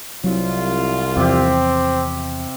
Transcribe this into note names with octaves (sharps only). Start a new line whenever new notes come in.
C2 F#3 F4
E2 C3 F3 C4 G4